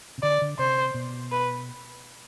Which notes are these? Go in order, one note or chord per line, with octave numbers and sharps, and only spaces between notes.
C3
D3 D5
D3
C3 C5
B2
B4